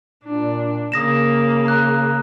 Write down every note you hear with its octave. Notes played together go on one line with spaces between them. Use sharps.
A#2 D4
C#3 A#3 D#6 A#6 E7
A#5 F#6